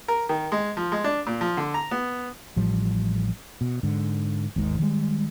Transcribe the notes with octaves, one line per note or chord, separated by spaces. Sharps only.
A#4
D#3
G#3
F3
G#3
D4
A#2
F3
D3
A#5
B3
A1 A2 F3 G3
B2
G#2 D3
G#1 D#2 G#2 D#3
D#3 E3 G3 G#3